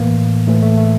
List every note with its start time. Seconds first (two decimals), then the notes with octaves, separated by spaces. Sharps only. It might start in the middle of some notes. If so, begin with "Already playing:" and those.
Already playing: A2 E3 A#3
0.47 A2 E3 A3
0.62 A3
0.78 A3